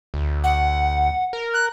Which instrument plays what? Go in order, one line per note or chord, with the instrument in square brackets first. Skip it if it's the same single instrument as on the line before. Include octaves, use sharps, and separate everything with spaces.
[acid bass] D2
[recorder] F#5
[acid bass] A#4
[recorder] F#6